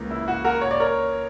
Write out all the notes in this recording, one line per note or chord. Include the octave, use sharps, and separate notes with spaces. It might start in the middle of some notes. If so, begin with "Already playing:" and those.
Already playing: C#2 C#3 E3 A#3
E4
F#4
F#4 A#4
C#5
D5
A#4 C#5